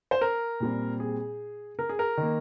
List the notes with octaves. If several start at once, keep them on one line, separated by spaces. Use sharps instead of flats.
C5
A#4
A#2 G3 C4
G#4
A#4
G#4
A#4
D#3 A#3